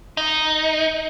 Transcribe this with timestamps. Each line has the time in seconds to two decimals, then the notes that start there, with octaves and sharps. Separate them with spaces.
0.17 D#4